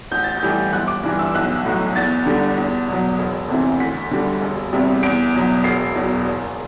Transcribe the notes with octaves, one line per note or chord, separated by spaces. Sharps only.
A1 G6
A6
G6
A2 E3 G3
G1 F#6
D6
G2 E3 G3
E6
B1 F#6
A2 F#3
E2 A6
D3 G3
E2
B2 F#3
E1
D2 C3 E3
D2 B6
D3 G3
E1
E2 C3 G3
E2 D7
B2 F#3
E1 C7
E2 B2 F#3
F#1